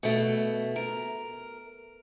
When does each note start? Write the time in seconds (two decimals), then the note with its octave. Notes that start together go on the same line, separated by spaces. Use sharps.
0.03 B2 A3
0.76 A#4